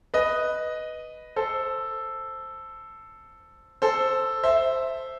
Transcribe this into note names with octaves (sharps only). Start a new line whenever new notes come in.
B4 D#5
A4 C5
A4 C5
C5 E5